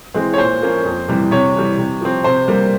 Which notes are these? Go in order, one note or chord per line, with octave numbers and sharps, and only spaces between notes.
E3 G#3 C4
C#5
A#2 C5
F3 A#3 C#4
F2
C3 E3 G3
C3 C#5
E3 G3
C3
F3 C4
C3 C5
G3 A#3